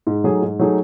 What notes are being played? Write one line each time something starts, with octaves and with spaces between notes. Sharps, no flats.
G#2
F#3 A3 D#4 G#4
G#2
F#3 A3 D#4 G#4